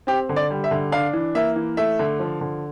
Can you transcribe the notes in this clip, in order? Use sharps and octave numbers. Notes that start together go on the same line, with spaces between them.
C4 G4
D3
D5
G3
E5
D3
D4 F5
E3
A#3 E5
E3
A3 E5
D3
F3
D3